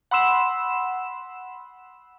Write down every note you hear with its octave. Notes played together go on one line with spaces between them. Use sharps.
F#5 B5 C6 E6 E7